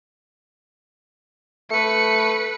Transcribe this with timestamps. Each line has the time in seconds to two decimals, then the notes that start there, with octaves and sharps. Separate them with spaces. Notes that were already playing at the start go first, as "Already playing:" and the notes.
1.71 A3 B4 C#7